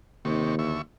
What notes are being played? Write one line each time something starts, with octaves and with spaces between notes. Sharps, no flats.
D#2 C3 D#3 C#6
D2 E5 C#6